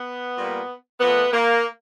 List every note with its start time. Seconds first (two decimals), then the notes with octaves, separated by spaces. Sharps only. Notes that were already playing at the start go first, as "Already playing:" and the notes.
Already playing: B3
0.37 A#2 G3 A#3
1.00 A#2 F3 A3 B3
1.32 A#3